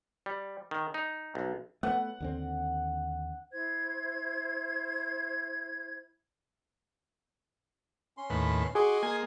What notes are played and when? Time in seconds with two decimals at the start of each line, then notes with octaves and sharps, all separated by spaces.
0.26 G3
0.71 D#3
0.94 D#4
1.35 B1
1.83 A3 B3 F#5
2.20 D#2 D3 C4
3.52 E4 C5 G#6
8.18 C#4 C6
8.30 D#2 A2 B4
8.75 F#4 G#4 D#5 G#5 C6 D6
9.03 A#3 G#4 G#6